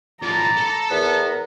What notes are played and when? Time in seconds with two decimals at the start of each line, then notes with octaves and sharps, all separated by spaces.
0.23 A2 F3 D5 A#5 B5
0.57 A4 A5
0.90 E2 B3 A#4